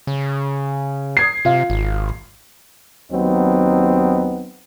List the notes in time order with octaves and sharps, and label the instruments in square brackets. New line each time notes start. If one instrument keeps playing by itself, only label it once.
[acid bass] C#3
[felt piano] D#6 G#6 C7
[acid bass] C3 [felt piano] F4 F5
[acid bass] G#1
[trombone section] D#2 F#3 B3 C4 D#4